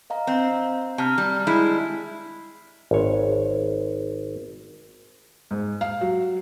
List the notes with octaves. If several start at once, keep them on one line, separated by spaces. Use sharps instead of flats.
D#5 F5 A#5
C4
C3 A5 A#5 F6
G3
G3 G#3 E4
G#1 C#5
G#2
F5
F#3